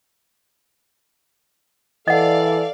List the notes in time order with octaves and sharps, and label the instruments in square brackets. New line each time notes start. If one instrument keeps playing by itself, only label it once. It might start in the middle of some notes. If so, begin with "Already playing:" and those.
[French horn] E3 [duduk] A4 [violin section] D5 F5 [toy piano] D#5 F#5